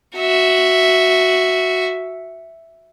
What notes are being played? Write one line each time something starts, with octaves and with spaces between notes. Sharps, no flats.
F#4 E5